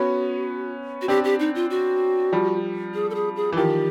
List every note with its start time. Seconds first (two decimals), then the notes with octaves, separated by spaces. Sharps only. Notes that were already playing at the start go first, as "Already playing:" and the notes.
Already playing: B3 C#4 F#4
1.02 F#4
1.08 C4 D4 G4
1.24 G4
1.40 D#4
1.55 F4
1.70 F#4
2.32 F3 G3
2.94 G#4
3.10 A4
3.15 G#4
3.36 G#4
3.53 E3
3.57 D#3 F3 G4